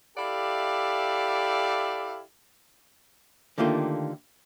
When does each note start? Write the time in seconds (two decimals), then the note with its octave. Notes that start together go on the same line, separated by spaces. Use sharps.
0.17 E4 G4 A4 D5 E5 F5
3.58 D3 D#3 A3 A#3 F4 G4